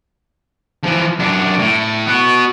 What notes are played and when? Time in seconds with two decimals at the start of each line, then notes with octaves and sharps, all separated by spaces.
0.83 E3 F3
1.19 F#2 D4
1.59 A2
2.07 B3 F#4